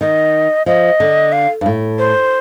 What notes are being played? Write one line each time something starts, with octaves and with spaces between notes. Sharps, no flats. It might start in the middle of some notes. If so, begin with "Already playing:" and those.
D#3 D#5
F3 D#5
D3
F5
G2
A2
C5